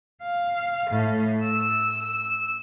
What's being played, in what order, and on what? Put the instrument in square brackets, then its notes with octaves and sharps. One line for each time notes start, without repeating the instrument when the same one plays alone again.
[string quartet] F5
A2
E6